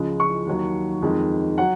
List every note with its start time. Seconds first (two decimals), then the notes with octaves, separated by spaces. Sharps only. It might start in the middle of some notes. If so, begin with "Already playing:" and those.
Already playing: C#2 C#3 F3 G#3
0.20 C#6
0.47 D#2 D#3 F#3
1.02 F2 D#3 G#3
1.58 F#3 F#5